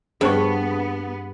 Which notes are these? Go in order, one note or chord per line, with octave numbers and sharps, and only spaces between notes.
G2 B3 G#4 C5 C#6